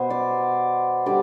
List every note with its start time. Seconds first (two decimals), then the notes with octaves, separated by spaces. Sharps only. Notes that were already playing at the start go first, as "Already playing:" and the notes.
Already playing: B2 B3 C5
0.10 D5
1.06 D3 G3 D5